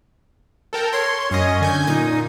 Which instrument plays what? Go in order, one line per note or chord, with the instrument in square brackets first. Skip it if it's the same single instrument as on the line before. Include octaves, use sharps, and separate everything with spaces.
[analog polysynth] A4 A#4 G5
[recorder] C#5 [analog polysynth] C6
[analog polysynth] F#2 D#5 [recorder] C#4
[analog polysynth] D3 G#5 G6
[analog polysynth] A#2 [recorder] D#4